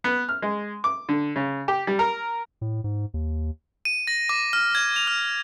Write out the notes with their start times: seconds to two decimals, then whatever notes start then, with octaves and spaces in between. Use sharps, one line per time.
0.04 B3
0.29 F6
0.42 G#3
0.84 D6
1.09 D3
1.36 C#3
1.68 G4
1.87 G3
1.99 A#4
2.61 A2
2.84 G#2
3.14 D#2
3.85 D#7
4.07 A#6
4.29 D6
4.53 F6
4.75 G#6
4.96 F7
5.07 F6